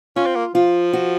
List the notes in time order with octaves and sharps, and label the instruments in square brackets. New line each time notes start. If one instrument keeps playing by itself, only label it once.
[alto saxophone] C#4 [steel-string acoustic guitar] F4
[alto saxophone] C4
A#3
[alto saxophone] F3 [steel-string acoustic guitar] F4
[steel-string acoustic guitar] F#4